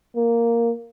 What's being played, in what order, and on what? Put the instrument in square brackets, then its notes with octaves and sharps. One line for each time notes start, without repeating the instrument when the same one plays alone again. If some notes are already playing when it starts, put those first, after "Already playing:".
[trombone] A#3